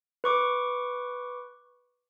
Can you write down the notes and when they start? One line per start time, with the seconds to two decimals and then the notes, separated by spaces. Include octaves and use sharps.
0.24 B4 C#6 D6